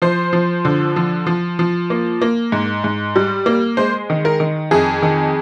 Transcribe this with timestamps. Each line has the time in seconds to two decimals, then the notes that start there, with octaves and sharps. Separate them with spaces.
0.02 F3 C5
0.33 F3
0.65 D3
0.96 F3
1.27 F3
1.59 F3
1.90 A#3
2.22 A#3
2.52 G#2
2.84 G#2
3.16 G3
3.46 A#3
3.77 G#3 C5
4.10 D#3
4.25 A#4
4.40 D#3
4.71 F2 G#4
5.02 D#3